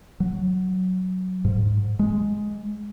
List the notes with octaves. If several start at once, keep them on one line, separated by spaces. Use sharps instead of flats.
F#3
G#2
G#3